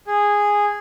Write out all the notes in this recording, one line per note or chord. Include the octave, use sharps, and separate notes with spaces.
G#4